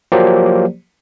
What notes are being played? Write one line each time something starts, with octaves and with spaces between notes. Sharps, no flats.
F3 F#3 A#3 G4 C5 D5